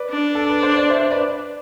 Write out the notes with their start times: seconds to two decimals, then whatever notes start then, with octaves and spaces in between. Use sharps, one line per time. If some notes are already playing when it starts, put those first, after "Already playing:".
Already playing: B4 D5
0.10 D4
0.35 A4
0.49 B4
0.63 C5
0.77 D5
0.90 C5 E5
1.11 B4 D5